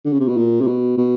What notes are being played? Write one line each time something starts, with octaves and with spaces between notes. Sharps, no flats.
D3
C#3
C3
B2
A#2
C3
B2
B2